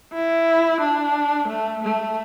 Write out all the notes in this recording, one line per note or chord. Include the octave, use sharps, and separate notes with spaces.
E4
D4
A3
A3